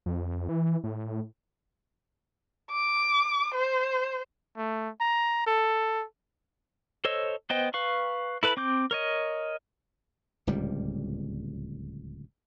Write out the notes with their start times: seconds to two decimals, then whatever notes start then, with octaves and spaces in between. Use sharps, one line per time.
0.06 F2
0.49 E3
0.84 A2
2.71 D6
3.54 C5
4.57 A3
5.00 A#5
5.47 A4
7.05 A4 C5 C#5 D#5 E6
7.50 B3 C5 D#5 G5
7.74 B4 F5 C#6
8.43 E4 A4 B4 A5 B5
8.57 C4 D6 G6
8.91 A#4 C#5 D#5
10.47 D1 C#2 A#2 G3